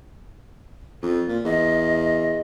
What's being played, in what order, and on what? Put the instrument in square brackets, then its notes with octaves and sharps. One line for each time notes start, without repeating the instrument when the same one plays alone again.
[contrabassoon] F2 [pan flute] F4
[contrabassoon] A#2
[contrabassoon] E2 [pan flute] D#5